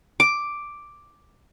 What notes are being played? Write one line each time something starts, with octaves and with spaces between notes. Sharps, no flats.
D6